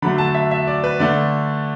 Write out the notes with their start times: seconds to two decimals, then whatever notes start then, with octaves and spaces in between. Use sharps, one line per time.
0.02 D3 F#3 A3 B5
0.18 A5
0.35 E5
0.51 E5
0.67 D5
0.84 B4
1.00 D3 A3 D5